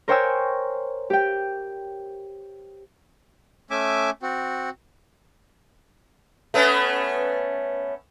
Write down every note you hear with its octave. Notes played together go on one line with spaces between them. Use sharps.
A#4 C5 C#5 G5 G#5 E6
G4 G5
A3 C#4 E5 G#5 D6
C4 F#4
A3 B3 C#4